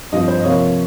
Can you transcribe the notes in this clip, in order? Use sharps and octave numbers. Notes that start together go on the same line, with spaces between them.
G2 F3 C4 F4 D#5
C5
D#5
C3 F3 A#3 F4 C#5